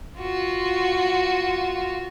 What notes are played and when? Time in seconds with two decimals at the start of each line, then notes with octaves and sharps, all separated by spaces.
0.20 F4 F#4